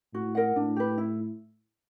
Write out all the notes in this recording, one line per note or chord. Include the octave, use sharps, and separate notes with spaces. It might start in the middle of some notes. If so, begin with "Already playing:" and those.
A2 F#4
A#4 D#5 F#5
A2 D4
G4 B4
E4